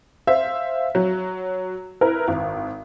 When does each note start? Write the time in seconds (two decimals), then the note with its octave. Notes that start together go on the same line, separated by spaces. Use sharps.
0.27 C5 E5 F5
0.95 F#3
2.01 E4 A#4 B4
2.28 G#1